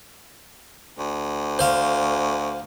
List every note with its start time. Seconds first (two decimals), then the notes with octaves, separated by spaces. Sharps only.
0.99 D2
1.59 C5 F5